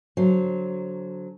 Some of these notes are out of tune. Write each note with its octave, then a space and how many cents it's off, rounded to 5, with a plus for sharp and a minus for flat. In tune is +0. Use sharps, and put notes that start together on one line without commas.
D3 -20 F#3 +0 C5 +0